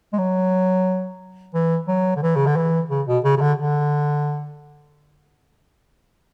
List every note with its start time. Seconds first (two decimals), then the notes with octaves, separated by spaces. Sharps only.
0.13 G#3
0.18 F#3
1.54 E3
1.88 F#3
2.16 D3
2.22 E3
2.36 C#3
2.46 D3
2.56 E3
2.90 C#3
3.07 B2
3.24 C#3
3.37 C#3
3.41 D3
3.58 D3